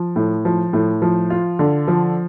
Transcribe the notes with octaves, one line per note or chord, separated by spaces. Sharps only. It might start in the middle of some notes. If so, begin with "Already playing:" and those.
Already playing: F3
A2
F3
A2
F3
F4
D3
F3